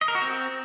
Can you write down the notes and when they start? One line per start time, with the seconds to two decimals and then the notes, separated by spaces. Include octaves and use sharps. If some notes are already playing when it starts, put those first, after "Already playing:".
0.01 D#5
0.08 A#4
0.15 F#4
0.22 C4